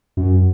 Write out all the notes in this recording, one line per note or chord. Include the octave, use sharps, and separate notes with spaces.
F#2